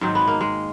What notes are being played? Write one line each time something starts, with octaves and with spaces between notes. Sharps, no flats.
G#2 D#3 F#3 C4
B3
A#3
G#3